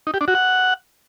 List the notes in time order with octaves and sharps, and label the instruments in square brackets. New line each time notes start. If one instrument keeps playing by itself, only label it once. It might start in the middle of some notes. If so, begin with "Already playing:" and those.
[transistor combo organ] D#4
G4
D4
F#4
F#5